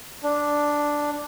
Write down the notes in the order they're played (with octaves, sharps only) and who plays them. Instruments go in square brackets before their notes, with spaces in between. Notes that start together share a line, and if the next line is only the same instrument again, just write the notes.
[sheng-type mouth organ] D4